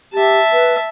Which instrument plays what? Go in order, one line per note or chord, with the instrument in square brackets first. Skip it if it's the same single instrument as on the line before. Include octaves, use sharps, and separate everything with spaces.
[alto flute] G4 [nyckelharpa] E5 A5
[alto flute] B4